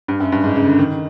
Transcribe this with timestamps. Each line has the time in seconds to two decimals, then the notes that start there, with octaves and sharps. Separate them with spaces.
0.08 G2
0.20 F#2
0.32 G2
0.44 G#2
0.56 C#3
0.67 D3
0.78 D#3